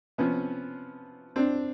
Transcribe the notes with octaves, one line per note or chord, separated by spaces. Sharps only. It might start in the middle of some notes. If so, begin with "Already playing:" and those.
C3 F3 B3 C#4
C4 D4